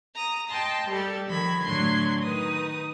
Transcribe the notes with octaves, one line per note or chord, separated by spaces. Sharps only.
A#5 D#6
D#5 G5 A5 C6
G3 G4 A4 A6
D#3 F3 B5 G#6
A2 D3 F#3 D4 C6 G#6
D#3 D#4 B4 D#6